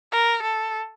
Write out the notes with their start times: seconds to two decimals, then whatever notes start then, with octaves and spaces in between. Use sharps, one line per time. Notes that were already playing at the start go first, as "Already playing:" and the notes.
0.12 A#4
0.42 A4